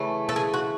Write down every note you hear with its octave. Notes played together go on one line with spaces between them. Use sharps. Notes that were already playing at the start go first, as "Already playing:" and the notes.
Already playing: C#3 E3 A3
A4
G#4
F#4